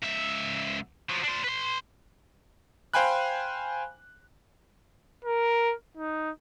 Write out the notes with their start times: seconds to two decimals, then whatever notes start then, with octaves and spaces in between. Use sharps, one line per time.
0.03 C#2 E5
1.09 F3 F#3
1.23 D4 C5
1.43 B4 C6
2.94 C5 F5 G5 G#5 B5 F#6
5.25 A#4
5.97 D#4